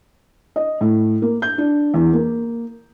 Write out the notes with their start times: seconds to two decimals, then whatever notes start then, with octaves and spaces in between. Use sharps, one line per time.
0.56 D#5
0.81 A2
1.22 A#3
1.42 G6
1.58 D4
1.94 E2
2.14 A#3